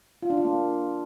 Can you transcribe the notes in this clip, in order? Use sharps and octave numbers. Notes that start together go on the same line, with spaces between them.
F4
D4
F4
A#3